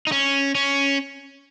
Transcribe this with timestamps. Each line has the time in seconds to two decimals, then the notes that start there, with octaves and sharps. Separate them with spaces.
0.07 D#4
0.12 C#4
0.55 C#4